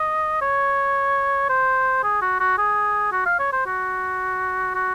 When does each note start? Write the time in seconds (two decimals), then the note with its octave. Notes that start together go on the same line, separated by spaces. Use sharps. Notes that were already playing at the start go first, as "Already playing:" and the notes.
Already playing: D#5
0.42 C#5
1.49 C5
2.04 G#4
2.22 F#4
2.40 F#4
2.58 G#4
3.12 F#4
3.26 F5
3.39 C#5
3.53 C5
3.67 F#4
4.75 F#4